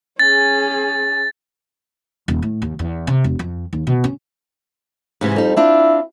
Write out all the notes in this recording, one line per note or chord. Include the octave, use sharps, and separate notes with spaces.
C#4 G#4 A6
D#1
A2
D#2
E2
C3
E1
F2
D#2
B2
C#4
G#2 C3 E3
F2 G3 D#4
C4 D4 E4 F4